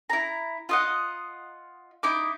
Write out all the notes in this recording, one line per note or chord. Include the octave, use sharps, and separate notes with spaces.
E4 A#5
F4 D#5 F#5
D#4 E4 D6